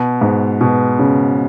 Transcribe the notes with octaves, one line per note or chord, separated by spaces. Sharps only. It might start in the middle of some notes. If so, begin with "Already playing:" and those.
Already playing: B2
G#2
B2
C#3